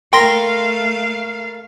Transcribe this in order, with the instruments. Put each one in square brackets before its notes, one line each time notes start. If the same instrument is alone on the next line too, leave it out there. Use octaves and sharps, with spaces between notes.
[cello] A3 F5 [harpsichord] E4 A#4 [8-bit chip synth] G5 C6 A#6